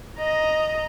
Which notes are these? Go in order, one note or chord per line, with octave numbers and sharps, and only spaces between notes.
D#5 A#5